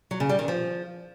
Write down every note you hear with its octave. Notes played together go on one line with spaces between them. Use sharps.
F#3
C#3
G3
D#3
F3